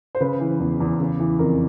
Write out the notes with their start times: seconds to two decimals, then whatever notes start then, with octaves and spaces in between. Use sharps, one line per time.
0.15 C5
0.20 C#3 B4
0.40 E3
0.60 E2
0.80 E2
1.00 C#3
1.20 E3
1.39 F2 A#4